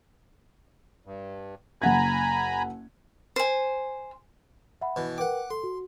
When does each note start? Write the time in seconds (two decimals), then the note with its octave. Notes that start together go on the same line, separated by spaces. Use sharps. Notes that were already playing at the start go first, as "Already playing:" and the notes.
1.05 G2
1.82 F#1 F#5 G#5 A#5 B5 G#6
3.36 C5 G#5
4.81 E5 F#5 B5
4.96 B2 E3
5.18 A#4 B4 F#5 G5 D6
5.50 A4 C6
5.64 F#4